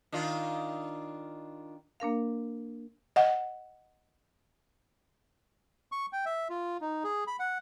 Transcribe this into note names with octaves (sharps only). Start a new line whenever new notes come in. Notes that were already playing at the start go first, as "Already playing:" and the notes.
D#3 D4 F4
A#3 D4 A#4 F5
D#5 F#5
C#6
G5
E5
F4
D#4
G#4
B5
F#5